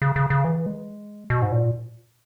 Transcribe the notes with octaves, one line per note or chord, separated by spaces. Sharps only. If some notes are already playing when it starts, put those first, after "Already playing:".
C#3
C#3
C#3
E3
G#3
B2
G#2
A#2